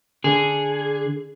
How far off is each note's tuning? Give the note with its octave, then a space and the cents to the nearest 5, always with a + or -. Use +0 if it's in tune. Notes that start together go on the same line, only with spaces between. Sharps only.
D3 +0 G#4 +0